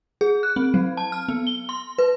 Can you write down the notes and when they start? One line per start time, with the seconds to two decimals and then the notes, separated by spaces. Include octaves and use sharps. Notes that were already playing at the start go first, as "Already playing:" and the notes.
0.21 G#4
0.43 F#6
0.56 C4
0.74 F#3
0.97 A5
1.12 F6
1.28 B3
1.47 G7
1.69 C6
1.98 B4